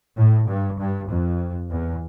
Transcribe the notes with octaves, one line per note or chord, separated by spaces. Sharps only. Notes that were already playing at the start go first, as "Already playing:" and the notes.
A2
G2
G2
F2
E2